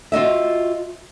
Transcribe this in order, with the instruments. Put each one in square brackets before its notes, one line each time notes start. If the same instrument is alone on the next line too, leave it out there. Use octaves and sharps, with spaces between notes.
[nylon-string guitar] F4 F#4 D#5 E5